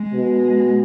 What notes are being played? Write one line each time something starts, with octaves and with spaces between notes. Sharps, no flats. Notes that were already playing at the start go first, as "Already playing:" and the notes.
Already playing: G#3
B2